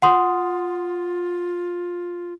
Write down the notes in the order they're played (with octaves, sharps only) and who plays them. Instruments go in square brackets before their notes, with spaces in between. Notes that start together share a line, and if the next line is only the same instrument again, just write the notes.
[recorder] F4 [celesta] F#5 C6 D#6